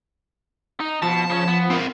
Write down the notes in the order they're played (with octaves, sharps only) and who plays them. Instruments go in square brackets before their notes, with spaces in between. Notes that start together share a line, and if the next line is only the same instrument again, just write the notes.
[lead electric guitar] D#4
[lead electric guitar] B2 [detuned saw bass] F3 [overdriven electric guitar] A5
[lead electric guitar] C#3 C#4
B3
[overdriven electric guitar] C4 A#4